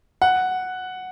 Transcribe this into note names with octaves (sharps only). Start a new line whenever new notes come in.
F#5